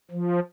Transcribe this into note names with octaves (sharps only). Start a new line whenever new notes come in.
F3